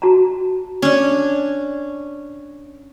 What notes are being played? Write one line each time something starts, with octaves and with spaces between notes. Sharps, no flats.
F#4 A5 A#5
C#4 D4